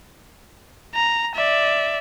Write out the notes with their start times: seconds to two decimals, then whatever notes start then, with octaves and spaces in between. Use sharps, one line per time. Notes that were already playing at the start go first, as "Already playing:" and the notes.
0.94 A#5
1.35 D5 E5